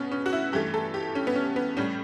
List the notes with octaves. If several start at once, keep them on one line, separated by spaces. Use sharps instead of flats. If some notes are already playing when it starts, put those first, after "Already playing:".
Already playing: B2 B3 C#4
C#4
F#4
E4
G2 E3 A3 G4
A4
G4
C#4
B3
C#4
B3
A2 G3 C#4